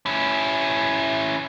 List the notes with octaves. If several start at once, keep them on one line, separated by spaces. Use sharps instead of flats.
C#4 E4